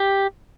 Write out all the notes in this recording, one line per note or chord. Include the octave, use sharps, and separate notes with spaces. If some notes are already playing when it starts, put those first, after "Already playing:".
Already playing: G4